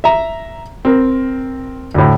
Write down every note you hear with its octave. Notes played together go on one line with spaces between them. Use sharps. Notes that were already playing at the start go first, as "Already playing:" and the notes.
E5 A#5
C4 A#4
D2 A2